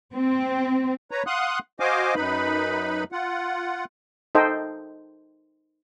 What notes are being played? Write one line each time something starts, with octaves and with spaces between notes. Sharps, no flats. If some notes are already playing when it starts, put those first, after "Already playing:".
C4
B4 C#5 A#5
F5 F#5 C6 D#6 F#6
F#4 C5 D#5 F5 G#5 D6
F#2 D#4 B4 B5
F4 F#5
D#4 A4 C5 D#5 G5